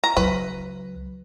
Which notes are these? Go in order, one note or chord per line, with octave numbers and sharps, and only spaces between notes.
A#5
C#2 F#3 B4